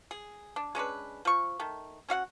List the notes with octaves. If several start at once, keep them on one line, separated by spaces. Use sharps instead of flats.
G#4
D4
G#3 C#4 D4 B4
F3 C#6
D#3 A3
C#4 F#4 F5 F#5